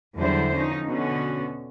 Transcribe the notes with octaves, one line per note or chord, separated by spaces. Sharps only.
E2 D3 F#3 G3 E4 C5
F3 C#4 D#4
B2 D3 B3 C#4 F#4